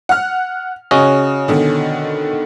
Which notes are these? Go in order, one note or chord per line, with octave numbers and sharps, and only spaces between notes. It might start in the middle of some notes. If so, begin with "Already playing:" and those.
F#5 F6
C#3 C#4 F#4 D#5
B2 D3 D#3